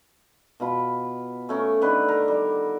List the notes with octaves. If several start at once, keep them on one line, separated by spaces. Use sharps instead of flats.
B2 F4 B5
A3 C#4 A#4
D3 D#3 B4
A#4
G3